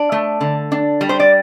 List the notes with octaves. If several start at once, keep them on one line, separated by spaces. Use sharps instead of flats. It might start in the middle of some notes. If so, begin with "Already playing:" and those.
Already playing: D4
A3
D3
D4
G3
C5
D5